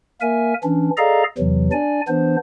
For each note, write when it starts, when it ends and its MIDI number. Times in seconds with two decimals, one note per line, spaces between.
0.21 0.54 58
0.21 0.54 70
0.21 0.54 76
0.21 0.54 80
0.64 0.90 52
0.64 0.90 61
0.64 0.90 62
0.97 1.23 68
0.97 1.23 69
0.97 1.23 74
0.97 1.23 75
0.97 1.23 77
0.97 1.23 82
1.38 1.70 40
1.38 1.70 48
1.38 1.70 52
1.38 1.70 54
1.72 2.01 62
1.72 2.01 74
1.72 2.01 80
2.08 2.36 52
2.08 2.36 59
2.08 2.36 62
2.08 2.36 72